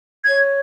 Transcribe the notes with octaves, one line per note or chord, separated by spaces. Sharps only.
C#5 G#6